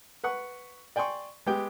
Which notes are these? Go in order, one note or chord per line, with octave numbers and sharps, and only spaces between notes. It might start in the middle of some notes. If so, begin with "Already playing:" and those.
B4 F#5 C#6
D5 G5 G#5 C6 C#6
G#3 B3 G4 G5